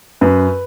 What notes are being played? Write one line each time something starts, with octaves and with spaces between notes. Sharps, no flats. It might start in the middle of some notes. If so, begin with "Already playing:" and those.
F#2 B4